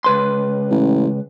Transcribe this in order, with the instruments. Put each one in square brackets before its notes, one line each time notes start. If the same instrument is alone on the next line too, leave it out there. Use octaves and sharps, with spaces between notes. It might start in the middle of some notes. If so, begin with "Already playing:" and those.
[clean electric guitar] C#2 B4 C6
[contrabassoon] A1